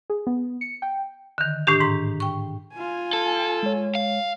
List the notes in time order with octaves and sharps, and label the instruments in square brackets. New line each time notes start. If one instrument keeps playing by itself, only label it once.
[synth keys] G#4
B3
C#7
G5
[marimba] D3 D#3
A2 D#3 D4 G4
G#2 A#5
G5 C#6
[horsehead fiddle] F4 G#5
[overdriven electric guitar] A4
[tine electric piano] G#3 C#5
[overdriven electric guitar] F5